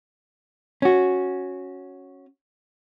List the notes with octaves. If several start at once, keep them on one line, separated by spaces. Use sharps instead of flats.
C#4 F#4